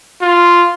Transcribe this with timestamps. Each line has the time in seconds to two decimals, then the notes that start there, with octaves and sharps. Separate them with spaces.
0.21 F4